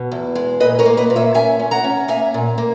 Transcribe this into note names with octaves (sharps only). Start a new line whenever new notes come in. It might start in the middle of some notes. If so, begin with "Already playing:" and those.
Already playing: B2
E2
G#3
A#2 B4 D#5
A#4 C#5
A#3
B4 D#5
A#2
C#5 E5
C#4 E5 G#5
C#4
F#5 A#5
C#4
A#3 E5 G#5
A#2
A#3